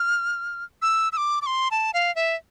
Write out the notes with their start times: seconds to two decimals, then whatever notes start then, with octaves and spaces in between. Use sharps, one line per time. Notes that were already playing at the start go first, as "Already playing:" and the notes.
Already playing: F6
0.82 E6
1.12 E6
1.17 D6
1.42 D6
1.46 C6
1.71 A5
1.94 F5
2.16 E5